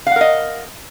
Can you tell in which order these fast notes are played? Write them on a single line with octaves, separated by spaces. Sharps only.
F5 F#5 A#4 D#5